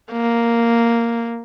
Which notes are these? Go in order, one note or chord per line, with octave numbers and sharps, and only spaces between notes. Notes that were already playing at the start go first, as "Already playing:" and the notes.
A#3